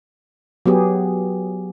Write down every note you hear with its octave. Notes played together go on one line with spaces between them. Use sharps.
F#3 B3 G4 G#4